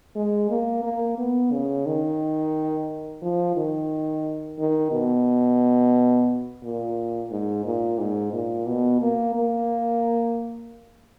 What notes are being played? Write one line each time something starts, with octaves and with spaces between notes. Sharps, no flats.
G#3
A#3
A#3
B3
C#3
D#3
F3
D#3
D#3
B2
A#2
G#2
A#2
G#2
A#2
B2
A#3
A#3